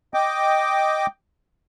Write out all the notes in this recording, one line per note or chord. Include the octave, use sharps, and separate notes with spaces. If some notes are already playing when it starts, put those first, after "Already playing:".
D#5 G5 D6